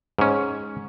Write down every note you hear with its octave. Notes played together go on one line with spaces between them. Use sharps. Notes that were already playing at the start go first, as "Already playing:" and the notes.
G#2 C#4